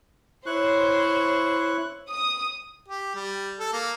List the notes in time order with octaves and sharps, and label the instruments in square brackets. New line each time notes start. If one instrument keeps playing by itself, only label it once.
[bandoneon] E4 C#6 F#6 [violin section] C5 C#5
[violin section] D#6
[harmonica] G4
G3
A4
A#3